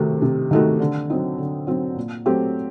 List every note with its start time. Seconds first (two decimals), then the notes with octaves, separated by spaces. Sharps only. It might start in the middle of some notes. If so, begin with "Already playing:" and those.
Already playing: C3 D#3 A3 D#4 F#4
0.22 C3
0.51 D#3 A3 D#4 F#4
0.79 D3
1.10 F#3 C4 D#4
1.38 D3
1.67 F#3 C4 D#4
1.96 A#2
2.26 F#3 A3 C4 G4